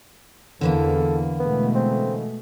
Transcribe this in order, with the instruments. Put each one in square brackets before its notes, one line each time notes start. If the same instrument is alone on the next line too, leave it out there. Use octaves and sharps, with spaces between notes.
[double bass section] E2 [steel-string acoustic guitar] D3 E3 A#3 [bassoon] A4
[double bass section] B2 G#3 A3 [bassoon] B3
[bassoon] C4